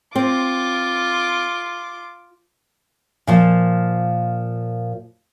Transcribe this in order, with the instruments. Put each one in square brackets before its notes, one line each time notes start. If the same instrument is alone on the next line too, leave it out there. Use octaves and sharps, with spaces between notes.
[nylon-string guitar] C4 [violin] F4 D6
[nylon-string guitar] A#2 F3 C5